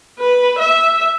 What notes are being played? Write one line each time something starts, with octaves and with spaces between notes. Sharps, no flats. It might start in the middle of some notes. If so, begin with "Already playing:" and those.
B4
E5